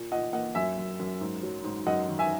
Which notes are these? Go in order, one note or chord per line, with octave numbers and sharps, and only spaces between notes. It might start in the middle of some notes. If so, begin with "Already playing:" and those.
Already playing: A#2
A#2 D#5 F#5
A#3 D#5 F#5
F#2 E5 G#5
F#2
F#2
G#2
F#3
G#2
F#2 D#5 F#5
D#3
E5 G#5